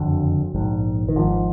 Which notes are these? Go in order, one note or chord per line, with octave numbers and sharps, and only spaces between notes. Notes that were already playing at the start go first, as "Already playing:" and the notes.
Already playing: F#1 F2 D3 F#3
A#1 G#2
D#3
G#1 G#2 F3